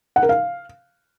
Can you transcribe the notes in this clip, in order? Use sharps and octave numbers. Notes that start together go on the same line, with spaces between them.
F#5
A#4
F5